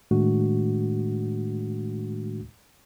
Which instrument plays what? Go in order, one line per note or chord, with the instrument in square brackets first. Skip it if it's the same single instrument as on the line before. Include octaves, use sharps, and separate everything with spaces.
[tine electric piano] A2 D#3 G#3 A3 D4 F#4